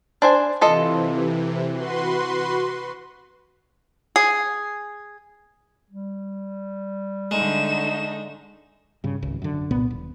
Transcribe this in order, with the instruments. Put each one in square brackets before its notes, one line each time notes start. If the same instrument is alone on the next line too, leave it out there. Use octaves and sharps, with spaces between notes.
[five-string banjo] D4 C5 G#5
[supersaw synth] C3 E3 [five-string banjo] F4 A4 D#5
[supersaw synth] F#4 B4 C6
[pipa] G#4
[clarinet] G3
[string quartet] D3 A3 D#4 [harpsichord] G#3 [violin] E7
[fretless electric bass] G2 C#3
G#1 C#2
F#2 D3
C2 A#2 B3
D#1